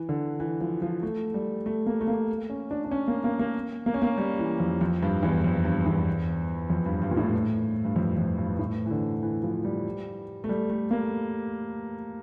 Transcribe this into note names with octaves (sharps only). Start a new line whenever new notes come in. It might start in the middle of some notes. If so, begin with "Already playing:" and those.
Already playing: E3
D3
E3
F3
F3
A3
G3
A3
A#3
A3
A#3
C#4
D4
D4
C#4
A#3
A#3
A#3
A#3
C#4
A#3
G3
E3
F2
F2
G2
E2
F2
G2
E2
F2
G2
G2
A#2
A2
G2
F2
F2
G2
G2
A2
E3
D3
E3
F3
G3
A3
G3
A3
A#3